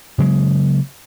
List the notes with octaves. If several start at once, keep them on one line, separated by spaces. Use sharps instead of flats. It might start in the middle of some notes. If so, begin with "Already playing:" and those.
C#3 F#3 G#3 A#3